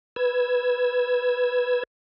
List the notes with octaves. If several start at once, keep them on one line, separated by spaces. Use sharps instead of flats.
B4 E6 G#6